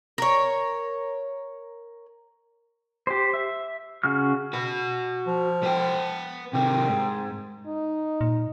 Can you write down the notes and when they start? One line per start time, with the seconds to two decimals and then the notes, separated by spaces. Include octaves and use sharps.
0.18 A#4 C#5
3.07 G4 C5
3.34 E5
4.03 C#3 F#4 F6
4.53 F#4 B4
5.27 F3
5.63 B3 G5
6.53 C3 D#3 C4
6.88 G#2
7.66 D#4
8.21 A#2